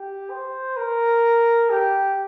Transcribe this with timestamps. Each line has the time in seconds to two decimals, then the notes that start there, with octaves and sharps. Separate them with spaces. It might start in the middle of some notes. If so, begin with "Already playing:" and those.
Already playing: G4
0.30 C5
0.77 A#4
1.70 G4